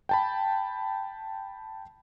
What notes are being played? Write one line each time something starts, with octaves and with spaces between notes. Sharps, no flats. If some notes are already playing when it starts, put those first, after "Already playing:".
G5 A5 B5